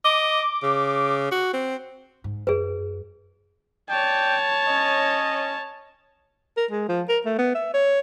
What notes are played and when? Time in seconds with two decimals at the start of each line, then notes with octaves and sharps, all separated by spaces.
0.04 D#5 D6
0.63 C#3
1.31 F#4
1.53 C4
2.24 G#2
2.47 F#2 G#4 B4
3.90 C#5 D5 G5 A5
4.68 C#4 D#5
6.58 A#4
6.71 G#3
6.89 F3
7.09 A#4
7.26 A3
7.39 B3
7.55 E5
7.74 C#5